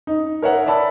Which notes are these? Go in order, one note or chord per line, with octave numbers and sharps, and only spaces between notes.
D#4
A#4 C#5 E5 F#5
D5 E5 A5 B5 E6